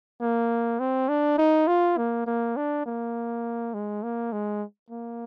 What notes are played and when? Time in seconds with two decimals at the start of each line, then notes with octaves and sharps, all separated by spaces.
0.21 A#3
0.80 C4
1.09 D4
1.38 D#4
1.68 F4
1.97 A#3
2.27 A#3
2.57 D4
2.86 A#3
3.74 G#3
4.03 A#3
4.33 G#3
4.90 A#3